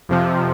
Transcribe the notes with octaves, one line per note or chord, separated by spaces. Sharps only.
F2 C3 F3